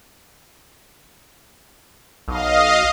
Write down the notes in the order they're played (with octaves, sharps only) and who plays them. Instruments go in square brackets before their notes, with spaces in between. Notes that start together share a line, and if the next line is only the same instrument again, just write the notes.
[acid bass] B1 [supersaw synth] D#5 F5